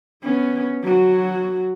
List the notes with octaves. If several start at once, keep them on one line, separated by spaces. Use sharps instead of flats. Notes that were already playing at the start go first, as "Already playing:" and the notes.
B3 C#4
F#3 F#4